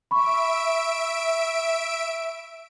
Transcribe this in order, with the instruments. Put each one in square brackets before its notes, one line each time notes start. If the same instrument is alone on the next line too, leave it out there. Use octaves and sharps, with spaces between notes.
[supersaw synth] E5 D7 [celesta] B5 C#6